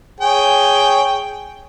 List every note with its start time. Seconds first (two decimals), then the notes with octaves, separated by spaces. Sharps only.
0.21 G#4 C#5 G5